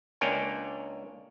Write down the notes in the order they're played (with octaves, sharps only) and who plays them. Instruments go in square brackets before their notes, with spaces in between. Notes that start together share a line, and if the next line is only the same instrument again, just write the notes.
[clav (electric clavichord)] C#2 A#3 D4 C#5 G5 G#5